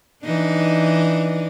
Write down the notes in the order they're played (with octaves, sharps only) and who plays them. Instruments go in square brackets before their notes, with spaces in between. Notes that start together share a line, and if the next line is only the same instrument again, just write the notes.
[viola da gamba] E3 D4 D#4